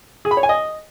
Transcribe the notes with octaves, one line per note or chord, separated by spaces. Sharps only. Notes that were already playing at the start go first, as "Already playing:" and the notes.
G#4
B5
C#5
G#5
D#5